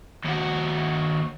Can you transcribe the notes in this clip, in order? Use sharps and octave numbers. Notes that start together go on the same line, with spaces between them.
D#2 F#4